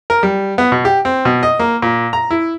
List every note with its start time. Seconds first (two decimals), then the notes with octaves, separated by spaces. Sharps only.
0.10 A#4
0.23 G3
0.58 B3
0.72 B2
0.85 G4
1.05 C4
1.25 B2
1.43 D#5
1.60 A#3
1.82 A#2
2.13 A#5
2.31 E4